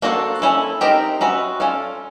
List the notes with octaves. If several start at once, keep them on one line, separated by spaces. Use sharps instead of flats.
A#3 D4 F#4 A4 C5
C#4 E4 A4
C4 D#4 G4 A#4
C#4 F#4 B4 E5
C#4 F4 A4 D5 F5